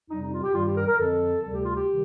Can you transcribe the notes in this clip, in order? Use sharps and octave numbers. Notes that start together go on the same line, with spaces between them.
F2 C3 G3 D#4
D#4
F4
G4
G2 D#3 G3 F4
G4
A#4
A#4
F2 D3 F3 A4
D2 C3 G3 A4
G4
F4
G4
C3 D#3 G3